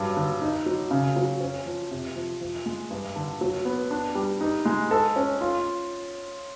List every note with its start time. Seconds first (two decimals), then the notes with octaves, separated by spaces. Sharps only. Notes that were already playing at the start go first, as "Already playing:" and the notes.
Already playing: G2 F#3
0.17 D3
0.41 D#4
0.66 F#3
0.91 C#3
1.16 F#3
1.41 C#4
1.66 F3
1.91 C3
2.16 F3
2.41 F3
2.66 G#3
2.90 G2
3.16 D3
3.41 F#3
3.65 B3
3.91 D4
4.15 G3
4.41 D#4
4.66 G#3
4.91 A4
5.16 C#4
5.41 F4